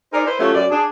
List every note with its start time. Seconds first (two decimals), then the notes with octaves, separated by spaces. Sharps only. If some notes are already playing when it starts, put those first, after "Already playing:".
0.13 D#4 G#4 A#4 C5 D5
0.26 E4 B4 C5
0.39 F#3 A3 C#4 F4 G4
0.55 F#2 D5
0.71 D4 G#4